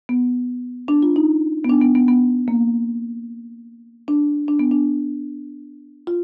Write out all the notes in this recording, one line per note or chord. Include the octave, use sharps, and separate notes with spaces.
B3
D4
F4
D#4
B3
D4
B3
B3
B3
A#3
D4
D4
B3
D4
F4